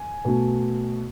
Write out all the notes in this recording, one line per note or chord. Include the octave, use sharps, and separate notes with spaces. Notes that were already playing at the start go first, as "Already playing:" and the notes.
Already playing: G#5
B2 A3